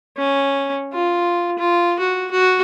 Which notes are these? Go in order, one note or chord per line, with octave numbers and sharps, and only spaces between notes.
C#4
F4
F4
F#4
F#4